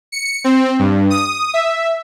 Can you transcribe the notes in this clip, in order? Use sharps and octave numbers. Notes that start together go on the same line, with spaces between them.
C#7
C4
G2
D#6
E5